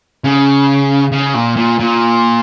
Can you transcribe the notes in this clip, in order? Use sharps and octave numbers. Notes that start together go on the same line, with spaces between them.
C#3
C#3
A#2
A#2
A#2